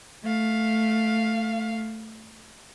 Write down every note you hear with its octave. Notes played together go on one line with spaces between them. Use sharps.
A3 F5